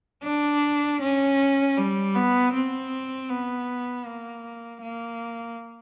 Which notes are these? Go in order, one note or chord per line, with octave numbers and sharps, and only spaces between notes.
D4
C#4
G3
B3
C4
B3
A#3
A#3